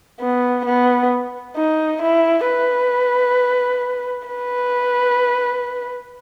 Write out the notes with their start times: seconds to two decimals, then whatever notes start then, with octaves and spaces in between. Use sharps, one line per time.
0.20 B3
0.65 B3
1.56 D#4
2.02 E4
2.47 B4
4.28 B4